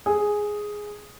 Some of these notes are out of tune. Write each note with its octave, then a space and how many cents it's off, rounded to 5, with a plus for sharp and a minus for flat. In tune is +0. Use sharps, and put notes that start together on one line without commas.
G#4 +0